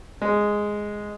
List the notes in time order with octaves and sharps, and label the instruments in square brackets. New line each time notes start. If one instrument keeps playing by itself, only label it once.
[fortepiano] G#3